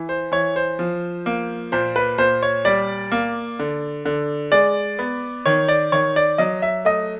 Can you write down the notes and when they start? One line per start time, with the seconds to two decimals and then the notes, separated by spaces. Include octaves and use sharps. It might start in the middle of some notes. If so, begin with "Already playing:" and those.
Already playing: E3
0.09 C5
0.32 E3 C#5
0.56 C5
0.79 F3
1.26 A#3
1.72 A#2 C5
1.96 B4
2.18 A#2 C5
2.43 C#5
2.65 G3 D5
3.12 A#3
3.59 D3
4.05 D3
4.52 G#3 D5
4.99 B3
5.46 D#3 C#5
5.68 D5
5.92 D#3 C#5
6.16 D5
6.38 F#3 D#5
6.62 E5
6.85 A3 D#5